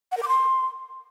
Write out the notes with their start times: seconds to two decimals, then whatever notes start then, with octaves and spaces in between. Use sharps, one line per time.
0.12 F#5
0.17 A#4
0.23 D6
0.28 C6